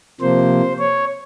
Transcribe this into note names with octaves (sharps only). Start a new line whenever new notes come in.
C3 F3 A#3 C5
C#5